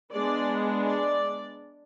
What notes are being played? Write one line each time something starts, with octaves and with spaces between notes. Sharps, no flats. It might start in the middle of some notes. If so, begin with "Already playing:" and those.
G#3 B3 D4 D5
D5